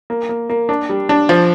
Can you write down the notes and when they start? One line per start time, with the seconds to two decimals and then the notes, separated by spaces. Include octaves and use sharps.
0.10 A#3
0.29 A#3
0.50 A#3
0.69 D4
0.89 G3
1.09 D4
1.29 F3